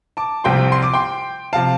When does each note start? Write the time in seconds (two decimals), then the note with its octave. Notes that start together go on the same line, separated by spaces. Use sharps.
0.17 A5 D6
0.44 C2 C3 F3 G5 C6
0.72 C6
0.82 D6
0.94 G5 C6
1.53 C3 F3 F5 A5